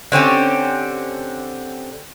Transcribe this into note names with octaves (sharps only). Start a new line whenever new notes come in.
D3 C4 C#4 G4